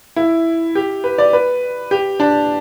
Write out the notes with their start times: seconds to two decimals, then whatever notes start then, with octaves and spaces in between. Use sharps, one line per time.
0.16 E4
0.75 G4
1.04 B4
1.18 D5
1.33 B4
1.91 G4
2.20 D4